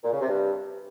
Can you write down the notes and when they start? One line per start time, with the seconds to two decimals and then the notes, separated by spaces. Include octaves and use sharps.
0.03 A#2
0.11 C#3
0.20 C3
0.28 G2